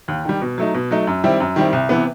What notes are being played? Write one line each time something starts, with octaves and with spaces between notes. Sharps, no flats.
D#2
D#3 G3
B2
F#3 A3 D#4
B2
F#3 A3 D#4
F#2
D#3 G3 C4 E4
F#2
D#3 G3 C4 E4
C2
C3 E3 B3